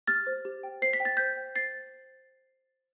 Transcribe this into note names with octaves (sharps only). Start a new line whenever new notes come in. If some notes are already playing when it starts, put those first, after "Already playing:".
G4 F6 A6
C5
G4
G5
C5 C7
B6
G5
A6
C5 G6 B6
G5
C5 A6 C7